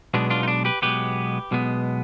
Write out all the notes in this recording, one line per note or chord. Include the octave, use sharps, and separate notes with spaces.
B1 B2 G#3 B3 D4
D4 F4
D#4
D4
G4 B4
B1 B2 G#3 B3 G4 B4
B1 B2 G#3 B3